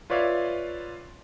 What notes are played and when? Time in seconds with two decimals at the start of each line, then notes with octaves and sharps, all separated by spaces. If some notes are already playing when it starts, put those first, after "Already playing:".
0.10 F4 B4 C#5 D5 E5 F5